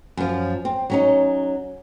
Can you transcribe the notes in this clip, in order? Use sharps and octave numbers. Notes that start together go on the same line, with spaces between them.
F#2 F3
C4
F#3 C#4 D#4